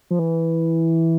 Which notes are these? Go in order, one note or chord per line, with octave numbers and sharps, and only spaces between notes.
F3
E3